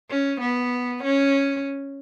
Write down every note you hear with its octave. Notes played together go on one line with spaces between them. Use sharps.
C#4
B3
C#4